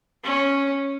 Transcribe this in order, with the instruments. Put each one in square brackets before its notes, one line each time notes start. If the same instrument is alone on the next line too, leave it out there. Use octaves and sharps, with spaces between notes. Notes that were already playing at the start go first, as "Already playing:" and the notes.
[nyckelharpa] C#4